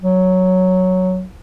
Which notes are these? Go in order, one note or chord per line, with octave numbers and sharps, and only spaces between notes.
F#3